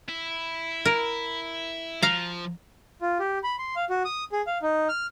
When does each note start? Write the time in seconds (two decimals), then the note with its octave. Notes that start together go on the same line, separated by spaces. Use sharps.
0.09 E4
0.85 A#4
2.02 F3 F5 A#5
3.01 F4
3.20 G4
3.44 B5
3.58 C6
3.76 F5
3.90 F#4
4.05 D#6
4.32 G#4
4.47 F5
4.62 D#4
4.89 F6